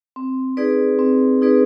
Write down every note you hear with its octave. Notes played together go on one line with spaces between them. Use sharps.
C4
D#4 G#4 B4 D5
C4
D#4 G#4 B4 D5